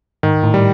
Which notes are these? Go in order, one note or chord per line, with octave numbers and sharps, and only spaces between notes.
G#2 D#3
A2
G3